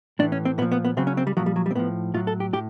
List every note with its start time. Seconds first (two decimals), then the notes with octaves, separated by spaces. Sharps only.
0.19 A2 E3 D4
0.32 C#4
0.45 C4
0.58 A#2 B3
0.62 F3
0.72 B3
0.85 B3
0.97 C#3 F#3 C4
1.07 C#4
1.17 C4
1.27 G3
1.37 A#2 F3 F#3
1.46 G3
1.56 F#3
1.66 G3
1.71 C4
1.75 A2 F3 B3
2.14 A2 F#3 F4
2.27 A4
2.40 G4
2.53 A2 G4